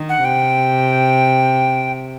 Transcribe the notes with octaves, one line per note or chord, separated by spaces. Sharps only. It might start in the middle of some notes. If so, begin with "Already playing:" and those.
Already playing: D#3
F#5
C3 G5